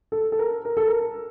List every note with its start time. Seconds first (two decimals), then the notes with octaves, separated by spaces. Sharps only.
0.12 A4
0.32 A4
0.39 A#4
0.65 A#4
0.77 A4
0.88 A#4